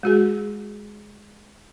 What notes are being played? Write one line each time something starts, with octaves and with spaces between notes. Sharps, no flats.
G#3 F#4 G#4